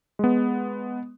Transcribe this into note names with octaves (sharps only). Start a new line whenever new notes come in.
G#3 B3